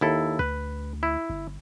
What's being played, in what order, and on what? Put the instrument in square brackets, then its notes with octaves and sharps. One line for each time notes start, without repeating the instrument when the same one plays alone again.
[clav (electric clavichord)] D#2 E4 A4
[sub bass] D2 [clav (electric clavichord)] B4
[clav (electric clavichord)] E4
[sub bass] G1